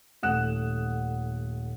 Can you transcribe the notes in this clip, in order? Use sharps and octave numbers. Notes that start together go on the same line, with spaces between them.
D#1 A3 F#5 D#6 F#6 E7